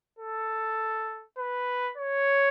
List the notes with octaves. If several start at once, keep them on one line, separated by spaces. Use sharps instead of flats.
A4
B4
C#5